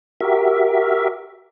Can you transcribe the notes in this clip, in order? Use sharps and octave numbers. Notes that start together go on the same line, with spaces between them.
F#4 G4 A#4 E5